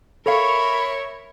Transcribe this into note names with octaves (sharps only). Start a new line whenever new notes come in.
A4 A#4 C#5 E5 F5 B5